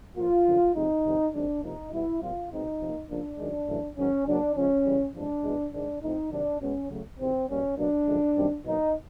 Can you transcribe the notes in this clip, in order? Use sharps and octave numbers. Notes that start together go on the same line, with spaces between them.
A2 F3 A#3 F4
F#2 D3 F3
C3 F3 G#3 C4 D#4
F2 C3 D#3 G3 C4
F#2 D#3 G#3 C4 D4
C3 F3 A#3 D#4
B2 G3 B3 E4
A#2 G3 C4 F4
B2 G#3 C4 D#4
C3 F3 A#3
C#3 F3 A#3 D4
F#2 D#3 G#3
F#2 C#3 E3 A3
G#2 D#3 F#3 C#4
F#2 C#3 F#3 A#3 D4
C#3 F3 G#3 C#4
C#3 E3 G3
E2 C3 F3 G#3 D4
E2 B2 G#3 B3
G#2 D#3 G#3 D4
A2 F3 A3 C4 D#4
C3 D#3 F#3 D4
B2 G#3 B3 C#4
C#3 F#3 A3
E2 C3 D#3 C4
B2 G3 A#3 C#4
B2 F#3 A#3 D4
F#2 D3 F3 G#3
F#2 D#3 G3 C4
B2 F#3 A#3 D#4